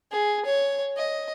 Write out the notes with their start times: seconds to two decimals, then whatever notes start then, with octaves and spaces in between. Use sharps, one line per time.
0.12 G#4
0.45 C#5
0.97 D#5